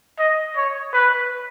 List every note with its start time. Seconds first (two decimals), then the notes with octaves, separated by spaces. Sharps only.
0.19 D#5
0.57 C#5
0.94 B4